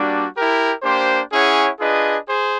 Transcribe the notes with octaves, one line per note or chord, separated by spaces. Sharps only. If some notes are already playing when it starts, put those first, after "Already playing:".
Already playing: G3 A#3 D4 F#4
E4 G4 A#4
A#3 D4 G4 C5
C#4 E4 G#4 C#5 F#5
D4 F4 G#4 B4 D#5
G#4 C5